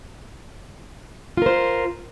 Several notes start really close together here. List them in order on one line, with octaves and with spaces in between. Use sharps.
F4 A#4 C5